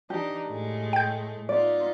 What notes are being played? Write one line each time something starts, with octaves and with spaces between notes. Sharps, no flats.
E3 D4 D#4 G4
A2 G#3 A3
G5 G6
B3 D#4 F4 D5